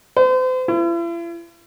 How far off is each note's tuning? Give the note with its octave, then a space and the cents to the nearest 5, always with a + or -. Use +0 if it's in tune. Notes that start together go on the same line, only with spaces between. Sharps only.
C5 -40
E4 +45